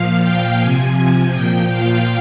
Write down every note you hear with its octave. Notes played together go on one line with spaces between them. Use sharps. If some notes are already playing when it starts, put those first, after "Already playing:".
Already playing: A#2 F3 F5
G5
C3 F3 G#5
G#5
A#2 F3 G5
F5